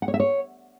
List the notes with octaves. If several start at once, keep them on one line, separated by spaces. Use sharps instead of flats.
F#5
C#5
E5
C#5